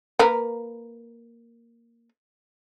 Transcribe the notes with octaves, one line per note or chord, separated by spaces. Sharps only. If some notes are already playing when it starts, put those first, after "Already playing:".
A#3 A#4 B4